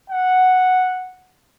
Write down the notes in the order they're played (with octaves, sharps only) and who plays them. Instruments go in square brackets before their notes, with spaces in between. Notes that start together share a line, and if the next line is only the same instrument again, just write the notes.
[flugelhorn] F#5